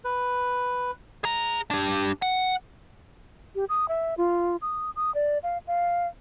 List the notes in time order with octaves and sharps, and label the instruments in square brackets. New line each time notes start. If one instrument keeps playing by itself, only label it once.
[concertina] B4
[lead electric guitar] G#4 A#5
D4 G4
F#5
[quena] G4
D#6
E5
F4
D#6
D#6
D5
F5
F5